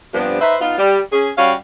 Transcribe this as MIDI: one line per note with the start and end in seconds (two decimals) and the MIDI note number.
0.13 0.37 43
0.13 0.37 48
0.13 0.37 53
0.13 0.37 59
0.13 0.37 62
0.40 0.56 63
0.40 0.56 71
0.40 0.56 72
0.40 0.56 76
0.60 0.75 59
0.60 0.75 63
0.60 0.75 65
0.78 0.99 55
1.11 1.29 61
1.11 1.29 68
1.37 1.53 55
1.37 1.53 61
1.37 1.53 66
1.37 1.53 77